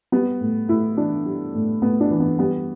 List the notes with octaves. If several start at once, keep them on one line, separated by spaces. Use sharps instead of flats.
G3 B3
A2
A2 E4
E3 D4
G3
A2
A2 B3
D4
E3
B3
G3 B3